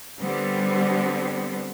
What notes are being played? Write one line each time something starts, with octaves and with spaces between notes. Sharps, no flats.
D3 G3 B3 C4